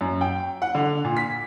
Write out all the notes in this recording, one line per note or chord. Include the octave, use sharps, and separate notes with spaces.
F#2
G5
F#5
D3
A#2
B6